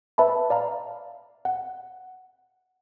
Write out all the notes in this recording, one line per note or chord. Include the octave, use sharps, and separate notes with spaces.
B4 E5 A5 B5
D5 F5 A#5
F#5